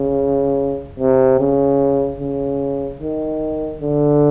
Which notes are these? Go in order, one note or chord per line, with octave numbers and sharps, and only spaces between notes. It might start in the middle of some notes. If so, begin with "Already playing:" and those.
Already playing: C#3
C3
C#3
C#3
D#3
D3